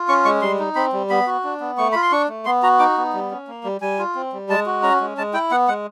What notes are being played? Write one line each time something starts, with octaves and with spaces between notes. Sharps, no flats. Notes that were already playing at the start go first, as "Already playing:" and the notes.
Already playing: F4
C#4 C#6
G#3 C#6
G3 C6
D#4
C4 B5
G3
B3 B5
F#4
D4
B3
A3 C#6
F4 B5
C6
D4 C#6
A3
B3 C6
F#4 A#5
D#4 D6
B3
G3
C#4
A#3
G3
G3 G#5
F4
C4
G3
G#3 A5
F#4
C#4 A#5
G#3
G#3 A5
E4 G5
B3 F#5
G#3 F#5